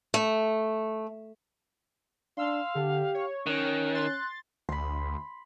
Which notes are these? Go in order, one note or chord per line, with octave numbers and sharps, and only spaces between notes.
A3
D4 F5 C6 E6
D3 G4
C#5
D#3 C#4 F#6
C6 F#6 A6
D2 B5 C6